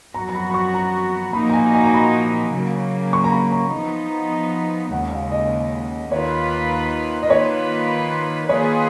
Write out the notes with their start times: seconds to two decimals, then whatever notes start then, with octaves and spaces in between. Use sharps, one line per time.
0.14 F#2 F3 B3 F#4 A#5
0.29 A#5
0.35 B5
0.50 B5
0.54 C#6
0.74 A#5
1.33 A#2 F3 A#3 D#4 F#4 B5
1.49 A#5
1.53 G#5
1.74 G#5
1.84 A#5
1.94 B5
2.53 C#3 F#3 A#3
3.13 C#6
3.24 A#5
3.32 B5
3.52 A#5
3.72 F3 B3 D#4
4.92 D#2 C#3 G#3 F#5
5.12 F5
5.31 D#5
6.12 D#2 D#3 A#3 F4 B4 C#5
7.23 D#5
7.30 D#3 A#3 F4 B4 C#5
8.49 D#3 A#3 F4 G#4 B4 C#5